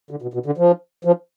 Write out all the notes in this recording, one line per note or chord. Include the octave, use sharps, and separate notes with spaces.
D3
B2
B2
D3
F3
F3